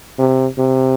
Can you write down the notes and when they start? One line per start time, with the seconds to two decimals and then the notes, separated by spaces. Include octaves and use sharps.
0.19 C3
0.58 C3